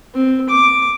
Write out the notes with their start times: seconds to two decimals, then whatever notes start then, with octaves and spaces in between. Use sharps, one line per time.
0.14 C4
0.49 D6